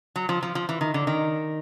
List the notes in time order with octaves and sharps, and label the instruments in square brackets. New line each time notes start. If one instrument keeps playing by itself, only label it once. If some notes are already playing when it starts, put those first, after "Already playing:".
[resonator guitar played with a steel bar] F#3
F3
F3
F3
E3
D#3
D3
D#3